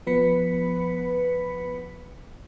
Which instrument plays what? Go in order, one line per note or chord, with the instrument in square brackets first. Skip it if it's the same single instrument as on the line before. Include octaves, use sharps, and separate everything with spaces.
[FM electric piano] F3 B3 B4 B5 B6 C#7